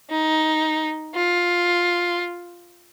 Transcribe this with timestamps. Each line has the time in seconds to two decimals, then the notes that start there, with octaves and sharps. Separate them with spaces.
0.10 D#4
1.15 F4